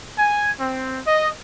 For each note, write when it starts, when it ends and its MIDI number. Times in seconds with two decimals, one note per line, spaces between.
0.18 0.52 80
0.59 1.01 60
1.06 1.29 75